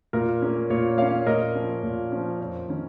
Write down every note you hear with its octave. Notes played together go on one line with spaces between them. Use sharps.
A#2 A#4
A#3 C#4
A#2 C#5
A#3 C#4 C#5 F5
A#2 A#4 D#5
F3 C#4
A#2
F3 C#4
F2
D#3 C#4